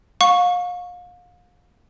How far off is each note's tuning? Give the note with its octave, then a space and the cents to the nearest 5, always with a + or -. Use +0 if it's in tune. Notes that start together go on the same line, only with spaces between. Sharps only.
F5 +35 C#6 +0